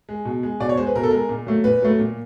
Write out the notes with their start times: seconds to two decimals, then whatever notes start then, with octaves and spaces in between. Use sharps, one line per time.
0.09 G#3
0.25 B2
0.43 G#3
0.60 B2 D5
0.69 C#5
0.77 G#3 C5
0.87 B4
0.95 B2 A#4
1.03 A4
1.11 G#3 A#4
1.29 A#2
1.47 F#3 A3
1.64 A#2 B4
1.82 F#3 A3
1.99 A#2